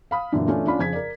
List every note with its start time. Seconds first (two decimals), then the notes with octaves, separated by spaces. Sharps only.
0.11 F5 B5 D#6
0.32 F#2 A#2 D3 E3 D4
0.47 E3 A3 C#4 D4 F4
0.66 C#4 D4 F4 B5
0.79 F2 C#3 G#4 G#6 B6
0.93 A#4 D5